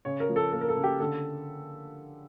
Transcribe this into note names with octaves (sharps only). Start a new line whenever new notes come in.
C#3 C#5
A#4
F3
A4
A#3 A4
A#4
A4
C#3
G4
D3 A4